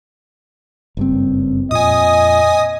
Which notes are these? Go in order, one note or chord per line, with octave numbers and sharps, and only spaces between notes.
F#1 G2 C4
F2 A#2 D#5 G#5 D#6